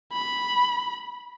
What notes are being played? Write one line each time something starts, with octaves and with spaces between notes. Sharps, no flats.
B5